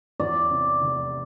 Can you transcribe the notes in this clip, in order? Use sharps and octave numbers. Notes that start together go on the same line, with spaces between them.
E2 D5
C3
F1